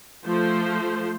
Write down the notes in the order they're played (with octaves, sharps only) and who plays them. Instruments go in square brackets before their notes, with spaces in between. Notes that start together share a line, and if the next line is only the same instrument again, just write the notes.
[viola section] F3 A3 C5